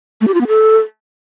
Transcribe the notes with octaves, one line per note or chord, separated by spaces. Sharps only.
A3
G4
F4
B3
A4